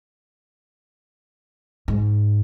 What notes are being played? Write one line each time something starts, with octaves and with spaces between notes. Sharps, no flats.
G#2